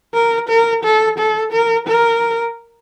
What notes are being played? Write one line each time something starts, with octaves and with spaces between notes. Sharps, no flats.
A#4
A#4
A4
A4
A#4
A#4